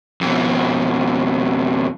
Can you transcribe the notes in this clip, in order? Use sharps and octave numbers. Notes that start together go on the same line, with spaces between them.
F2 B2